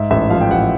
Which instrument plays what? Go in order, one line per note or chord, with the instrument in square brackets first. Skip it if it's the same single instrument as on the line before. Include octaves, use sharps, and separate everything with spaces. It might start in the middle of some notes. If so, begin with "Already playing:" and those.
Already playing: [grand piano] G#2 E5
A1 E5
F3 F5
G5
A1 F#5